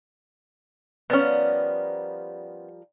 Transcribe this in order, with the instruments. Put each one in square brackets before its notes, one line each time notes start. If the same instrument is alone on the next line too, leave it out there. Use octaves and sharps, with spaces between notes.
[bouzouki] F3 G3 A#4 [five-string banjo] B3 C#4